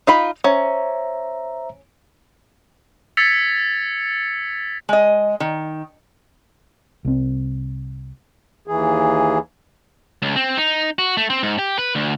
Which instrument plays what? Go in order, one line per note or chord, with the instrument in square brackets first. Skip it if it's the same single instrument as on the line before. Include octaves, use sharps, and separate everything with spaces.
[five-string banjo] D#4 F4 B5
[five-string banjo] C#4 [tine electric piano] C5 E5 A#5
[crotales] E6 G#6 A6 B6 C#7 F7
[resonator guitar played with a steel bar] G#3 D#5
D#3
[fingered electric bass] C2 C4
[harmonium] D#2 E3 G#4
[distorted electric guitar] C#2
C4
D#4
F#4
A3
C4
G#2
G4
B4
D2